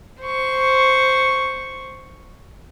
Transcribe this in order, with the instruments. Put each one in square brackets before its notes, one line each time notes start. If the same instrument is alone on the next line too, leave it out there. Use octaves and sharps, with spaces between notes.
[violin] C5 C#6